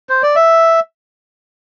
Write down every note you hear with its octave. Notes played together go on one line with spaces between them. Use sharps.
C5
D5
E5